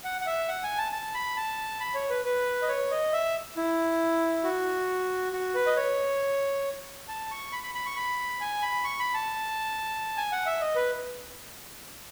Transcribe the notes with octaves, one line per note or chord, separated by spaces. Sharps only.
F#5
F#5
E5
F#5
G#5
A5
A5
B5
A5
B5
C#5
B4
B4
D#5
C#5
D#5
E5
E4
F#4
F#4
B4
D#5
C#5
A5
C#6
B5
B5
B5
C#6
B5
G#5
B5
C#6
B5
A5
G#5
F#5
E5
D#5
B4